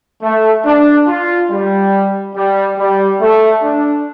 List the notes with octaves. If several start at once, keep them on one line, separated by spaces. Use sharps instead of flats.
A3
D4
F4
G3
G3
G3
A3
D4